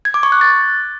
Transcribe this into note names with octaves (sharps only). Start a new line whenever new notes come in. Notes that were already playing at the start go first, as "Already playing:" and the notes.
G#6
D6
C#6
F#6
A6